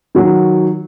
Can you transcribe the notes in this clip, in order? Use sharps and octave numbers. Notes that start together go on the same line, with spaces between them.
D#3 F#3